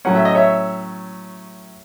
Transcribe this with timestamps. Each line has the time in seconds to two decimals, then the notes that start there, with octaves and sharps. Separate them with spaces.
0.05 A2 F#3 C#4 F#5
0.15 E5
0.25 D#5
0.35 C#5 E5